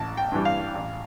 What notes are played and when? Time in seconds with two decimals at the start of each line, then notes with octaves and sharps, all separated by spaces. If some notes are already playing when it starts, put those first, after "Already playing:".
Already playing: A1 A5
0.17 G5
0.32 G2 E3 G3
0.45 F5
0.75 A1